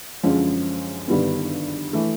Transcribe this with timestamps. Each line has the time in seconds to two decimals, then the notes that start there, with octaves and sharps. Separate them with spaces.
0.23 F#2 D3 F3 G#3 C#4
1.08 G1 G2 D#3 G3 B3
1.93 E3 A3